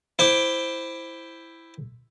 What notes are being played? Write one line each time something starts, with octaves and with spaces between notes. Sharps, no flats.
E4 C5 G5 D6